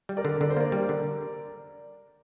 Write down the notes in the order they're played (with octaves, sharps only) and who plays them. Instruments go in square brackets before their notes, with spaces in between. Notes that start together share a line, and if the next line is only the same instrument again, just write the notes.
[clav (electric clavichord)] G3
[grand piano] A#4 D5
[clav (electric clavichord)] D3
[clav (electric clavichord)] D3 [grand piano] D5
[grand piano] C5
[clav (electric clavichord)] A#3 [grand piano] A#4 D5
[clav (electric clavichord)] G3
D3